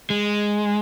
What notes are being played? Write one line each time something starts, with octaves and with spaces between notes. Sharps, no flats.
G#3